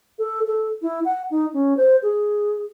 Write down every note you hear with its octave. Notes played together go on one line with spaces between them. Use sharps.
A4
A4
E4
F#5
D#4
C#4
C5
G#4